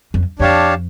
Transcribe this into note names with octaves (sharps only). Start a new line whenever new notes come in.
F2
F2 D4 G4 C#5 F5 A5